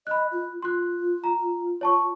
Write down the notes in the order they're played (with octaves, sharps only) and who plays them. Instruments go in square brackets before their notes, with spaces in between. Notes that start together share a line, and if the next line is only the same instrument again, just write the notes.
[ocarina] D#5 [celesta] B5 F#6
[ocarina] F4
[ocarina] F4 [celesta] C6 F#6
[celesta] A#5
C#5 A5 C#6